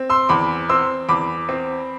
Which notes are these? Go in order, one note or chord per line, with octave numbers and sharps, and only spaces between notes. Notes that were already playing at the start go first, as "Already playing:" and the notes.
Already playing: C4
C6 E6
E2 B5 D6
C4 C6 E6
E2 B5 D6
C4